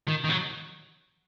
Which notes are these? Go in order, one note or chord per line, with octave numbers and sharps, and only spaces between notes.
D#3
D#3
F#3